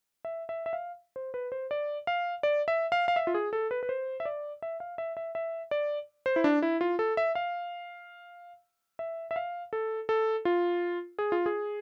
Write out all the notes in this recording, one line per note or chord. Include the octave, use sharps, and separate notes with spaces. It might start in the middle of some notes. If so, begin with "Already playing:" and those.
E5
E5
E5
F5
C5
B4
C5
D5
F5
D5
E5
F5
F5
E5
F4
G#4
A4
B4
B4
C5
E5
D5
E5
F5
E5
E5
E5
D5
C5
E4
D4
E4
F4
A4
E5
F5
E5
E5
F5
A4
A4
F4
G#4
F4
G#4